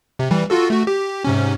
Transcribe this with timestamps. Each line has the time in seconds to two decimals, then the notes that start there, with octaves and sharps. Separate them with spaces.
0.19 C3
0.31 E3 G3
0.50 F4 F#4 A4
0.70 A3 F#4
0.87 G4
1.25 G#2 C3 C#4